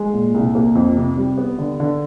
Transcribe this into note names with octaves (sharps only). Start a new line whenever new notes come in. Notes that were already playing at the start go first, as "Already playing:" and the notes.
Already playing: G#3
A#2
C2
A#3
F2
C3
G3
B3
D3
D3